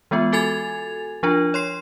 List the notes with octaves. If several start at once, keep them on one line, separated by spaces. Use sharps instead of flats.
E3 G#3 B3 F4
F#4 A4 G#5 G#6 A6 F7
F3 D4 F4
C#5 C6 C7